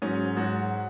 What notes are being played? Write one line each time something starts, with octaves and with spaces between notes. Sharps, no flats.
G#2 F#3 C#4
G#2 F#3 F#4